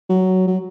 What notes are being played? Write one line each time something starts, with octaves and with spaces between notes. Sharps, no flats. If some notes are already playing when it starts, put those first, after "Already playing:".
F#3
F#3